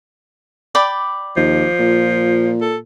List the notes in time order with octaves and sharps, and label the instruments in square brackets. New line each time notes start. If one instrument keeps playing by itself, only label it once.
[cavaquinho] D5 G5 B5
[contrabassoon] D#2 [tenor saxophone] F3
[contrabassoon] A#2
[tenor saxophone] A4